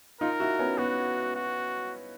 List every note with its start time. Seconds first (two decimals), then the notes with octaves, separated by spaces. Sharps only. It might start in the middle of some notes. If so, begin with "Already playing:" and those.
0.21 D#4 F4 A#4
0.40 E4 F#4
0.59 B3 C#4
0.78 B3 F#4
1.36 F#4